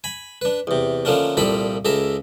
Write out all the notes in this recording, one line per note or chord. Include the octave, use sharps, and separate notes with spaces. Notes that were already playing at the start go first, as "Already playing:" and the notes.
G#5 B5
D4 B4
E2 C3
D3 F3 A3 A#3 C#4 D4
C2 A#2 F3 G3 A4 B5
C#2 C#3 A4 E5 A#5